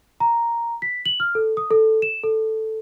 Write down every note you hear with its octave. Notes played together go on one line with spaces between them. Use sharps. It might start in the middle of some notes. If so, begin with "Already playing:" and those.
A#5
B6
F#7
F6
A4
D#6
A4
E7
A4